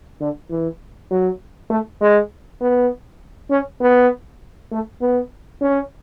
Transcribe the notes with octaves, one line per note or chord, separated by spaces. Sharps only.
D3
E3
F#3
A3
G#3
B3
C#4
B3
A3
B3
C#4